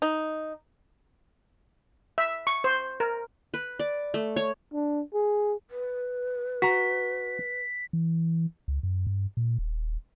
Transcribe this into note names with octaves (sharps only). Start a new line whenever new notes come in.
D#4
E5
C#6
C5
A#4
B4
D5
A3
C#5
D4
G#4
B4
F#4 A#5 B6
E3
C#2
F#2
G2
A#2
D#1